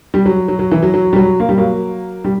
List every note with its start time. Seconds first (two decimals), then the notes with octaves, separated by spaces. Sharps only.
0.14 G3
0.25 F#3
0.48 F#3
0.59 F#3
0.71 E3
0.83 F#3
0.94 F#3
1.13 G3
1.16 F#3
1.40 A#3
1.49 G3
1.58 F#3 A#3
2.25 G3